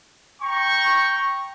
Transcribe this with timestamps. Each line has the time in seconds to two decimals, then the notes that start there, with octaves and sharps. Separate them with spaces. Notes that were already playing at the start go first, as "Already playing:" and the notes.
0.42 G5 A#5 C#6